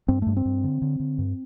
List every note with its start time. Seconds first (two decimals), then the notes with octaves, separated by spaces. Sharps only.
0.08 G2 C4
0.22 G2 A3
0.37 C4
0.45 G2
0.64 D3
0.82 D3
1.00 D3
1.18 G2